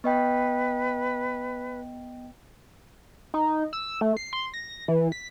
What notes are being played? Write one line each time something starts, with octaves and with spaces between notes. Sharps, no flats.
B3 B4 D#5 G5
D#4
E6
A3
C7
C6
A#6
E3
B6